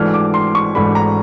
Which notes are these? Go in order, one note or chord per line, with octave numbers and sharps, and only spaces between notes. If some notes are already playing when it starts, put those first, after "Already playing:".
Already playing: G#1 G#2 E3 A3 D4 F6
D6
C6
C#6
G#1 G#2 E3 A3 D4 B5
A#5